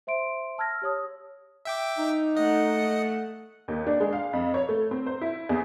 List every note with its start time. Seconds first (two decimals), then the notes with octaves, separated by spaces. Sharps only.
0.07 C5 E5 C6 D7
0.58 A5 E6 F6 G#6 A#6
0.82 G4 C#5 D#6
1.65 E5 G5 D6
1.98 D#4
2.36 A3 D#5 F#5
3.68 D#2
3.87 D4
4.00 G#3
4.13 F5
4.33 F2
4.54 C#5
4.69 A3
4.91 C4
5.06 C5
5.21 E4
5.49 E2